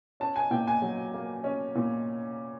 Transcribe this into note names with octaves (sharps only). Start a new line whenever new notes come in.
C#4 A5
G#5
A#2 G5
G#5
F#3
A#3
C#4
A#2